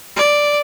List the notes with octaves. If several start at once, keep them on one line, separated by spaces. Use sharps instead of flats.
D5